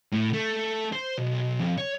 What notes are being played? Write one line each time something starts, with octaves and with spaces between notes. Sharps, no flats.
A2
A3
C5
B1
F2
C#5